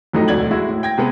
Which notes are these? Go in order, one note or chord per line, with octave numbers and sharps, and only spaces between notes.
F2 A2 F#3 G3 A3 D#4
E1 D2 A3 D5 G#6 F#7
G#3 E4 F#4
A2
G5 G#6 A#6
C3 G#3 B3